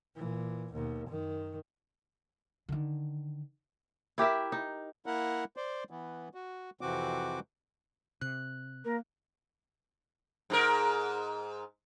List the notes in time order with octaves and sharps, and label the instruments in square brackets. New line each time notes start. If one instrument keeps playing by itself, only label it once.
[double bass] A#2 E3
D#2 B2
F#2 D#3
[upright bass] D3 D#3
[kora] E4 G4 A#4 E5
D#4
[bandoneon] A#3 E4 A#4 F#5
C5 D5
E3 B3
F#4
F2 C3 E3 C4 F#4 D6
[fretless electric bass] C3 [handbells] F#6
[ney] A#3 [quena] A#4
[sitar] G#2 F#4 A#4